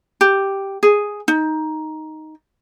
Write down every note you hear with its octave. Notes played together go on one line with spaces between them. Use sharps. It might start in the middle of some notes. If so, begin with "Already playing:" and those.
G4
G#4
D#4